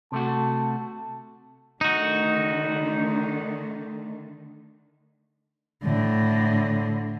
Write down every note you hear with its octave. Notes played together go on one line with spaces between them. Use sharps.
C3 A3 F#4 A5
D3 D#3 A3 D#4 F#4
A2 D3